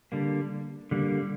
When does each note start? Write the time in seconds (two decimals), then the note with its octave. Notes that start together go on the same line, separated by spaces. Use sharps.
0.12 D3 G3 A#3
0.91 D3 G3 A#3